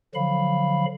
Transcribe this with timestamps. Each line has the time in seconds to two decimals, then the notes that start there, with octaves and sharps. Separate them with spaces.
0.15 D3 F3 F#3 F5 B5